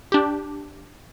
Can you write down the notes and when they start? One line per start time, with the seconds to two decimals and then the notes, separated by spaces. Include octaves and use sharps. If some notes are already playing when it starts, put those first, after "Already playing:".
0.12 D4 G4